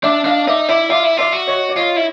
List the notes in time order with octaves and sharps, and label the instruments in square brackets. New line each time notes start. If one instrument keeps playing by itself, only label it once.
[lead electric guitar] D4 [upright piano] D5 E5
[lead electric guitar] D4 [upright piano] D#5 F5
[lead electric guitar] D#4 [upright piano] D5 E5
[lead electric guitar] E4 [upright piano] D5 E5
[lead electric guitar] F4 [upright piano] D5 E5
[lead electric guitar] E4
[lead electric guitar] F4 [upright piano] D5 E5
[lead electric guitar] F#4
[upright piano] C#5 D#5
D5
[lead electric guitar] F4 [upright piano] C#5 D#5
[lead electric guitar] E4